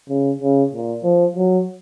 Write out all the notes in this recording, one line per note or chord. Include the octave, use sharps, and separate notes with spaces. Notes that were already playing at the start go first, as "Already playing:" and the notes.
C#3
C#3
A#2
F3
F#3